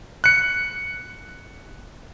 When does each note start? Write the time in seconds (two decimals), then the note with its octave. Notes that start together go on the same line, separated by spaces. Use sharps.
0.24 F#6 C#7